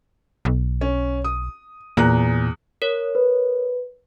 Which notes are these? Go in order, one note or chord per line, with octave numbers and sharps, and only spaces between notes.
B1
C#4
D#6
E2 A#2 A#5 F#6
A#4 C#5
B4